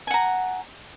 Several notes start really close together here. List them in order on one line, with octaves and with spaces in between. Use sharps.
G#5 F#5 A#5